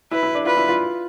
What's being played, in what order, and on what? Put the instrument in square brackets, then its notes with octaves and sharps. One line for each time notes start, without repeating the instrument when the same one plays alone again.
[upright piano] E4 [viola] B4
[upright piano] E4
D4
[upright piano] F4 [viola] B4
[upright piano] E4
F4